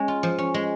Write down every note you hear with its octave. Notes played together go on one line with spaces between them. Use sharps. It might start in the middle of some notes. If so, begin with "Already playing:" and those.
Already playing: G#3 C#4
F4
F3
C#4
G#3